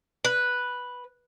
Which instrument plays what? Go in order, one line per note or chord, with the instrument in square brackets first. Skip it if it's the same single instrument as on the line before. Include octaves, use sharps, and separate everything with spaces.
[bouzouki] B4